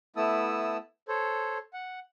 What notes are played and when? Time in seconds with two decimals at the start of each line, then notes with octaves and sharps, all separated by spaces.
0.16 A3 B3 E4 A5 D#6 E6
1.08 A4 C5 C#5
1.73 F#5